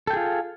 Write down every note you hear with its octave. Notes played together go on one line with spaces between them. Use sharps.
F4 G#4 A4 G5